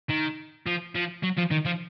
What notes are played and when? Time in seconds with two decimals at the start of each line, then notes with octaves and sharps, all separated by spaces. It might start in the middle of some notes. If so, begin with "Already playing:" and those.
0.10 D#3
0.67 F3
0.95 F3
1.23 F#3
1.38 F3
1.51 D#3
1.66 F3